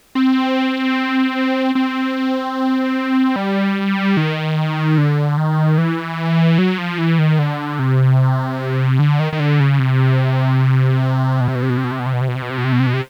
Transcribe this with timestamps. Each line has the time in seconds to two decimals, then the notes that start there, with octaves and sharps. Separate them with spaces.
0.15 C4
1.75 C4
3.36 G3
4.17 D#3
4.98 D3
5.37 D#3
5.78 E3
6.58 F#3
6.78 F3
6.98 E3
7.19 D#3
7.39 D3
7.79 C3
8.99 D3
9.20 D#3
9.33 D#3
9.40 D3
9.60 C#3
9.79 C3
11.41 B2
11.48 C3
11.55 B2
11.62 C3
11.70 B2
11.77 C3
11.84 B2
11.91 C3
11.99 B2
12.06 C3
12.13 B2
12.21 C3
12.28 B2
12.35 C3
12.42 B2
12.50 C3
12.58 B2
12.64 C3
12.72 B2
12.80 C3
12.87 B2
12.94 C3